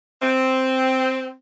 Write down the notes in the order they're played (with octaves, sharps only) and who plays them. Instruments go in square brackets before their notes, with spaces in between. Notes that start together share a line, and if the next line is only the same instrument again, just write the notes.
[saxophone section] C4